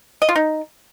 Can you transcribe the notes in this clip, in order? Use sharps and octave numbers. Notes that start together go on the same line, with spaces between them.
D#5
F4
D#4